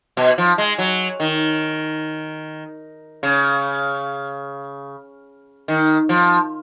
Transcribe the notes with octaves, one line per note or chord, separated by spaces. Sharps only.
B2
F3
G#3
F#3
D#3
C#3
D#3
F3